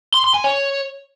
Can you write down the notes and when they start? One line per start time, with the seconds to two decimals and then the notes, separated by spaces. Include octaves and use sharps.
0.14 C6
0.24 C6
0.34 G#5
0.44 C#5